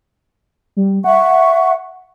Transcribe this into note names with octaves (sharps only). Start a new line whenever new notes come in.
G3
E5 F#5 C#6